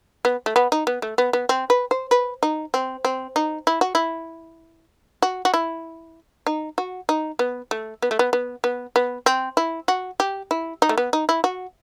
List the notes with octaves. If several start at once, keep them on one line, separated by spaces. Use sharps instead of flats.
B3
A3
B3
D#4
B3
A3
B3
B3
C4
B4
C5
B4
D#4
C4
C4
D#4
E4
F#4
E4
F#4
F#4
E4
D#4
F#4
D#4
B3
A3
B3
A3
B3
B3
B3
B3
C4
E4
F#4
G4
E4
D#4
A3
B3
D#4
E4
F#4